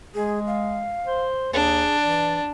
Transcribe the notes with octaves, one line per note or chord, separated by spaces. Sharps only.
G#3 G#4
F5
C5
D#2 D4 G#4
E3 D5